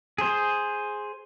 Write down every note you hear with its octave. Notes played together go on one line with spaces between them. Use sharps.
G#4 C5